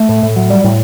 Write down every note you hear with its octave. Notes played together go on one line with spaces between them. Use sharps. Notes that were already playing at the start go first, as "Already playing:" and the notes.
Already playing: A3
A2
A2
F#3
G3
A2